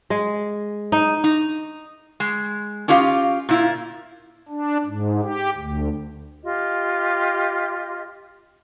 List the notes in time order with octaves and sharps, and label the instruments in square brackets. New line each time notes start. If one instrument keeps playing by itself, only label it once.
[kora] G#3
D#4
[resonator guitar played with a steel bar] D#4
G#3
C#4 D4 F4 G4 D#5 F5
A#2 E4 F4
[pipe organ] D4
G#2
G4
D2
[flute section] F4 G4 D#5